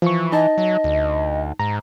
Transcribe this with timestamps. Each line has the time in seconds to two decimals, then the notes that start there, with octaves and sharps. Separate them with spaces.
0.02 E3 F3 C#6
0.32 D#4 D#5 A5
0.58 F#3
0.84 D2
1.59 G#2 A#5